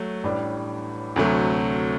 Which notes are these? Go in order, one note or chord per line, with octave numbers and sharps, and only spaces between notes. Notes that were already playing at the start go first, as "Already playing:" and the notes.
Already playing: F#3 A3
A1 A2 G3 D4
D2 C3 F#3 A3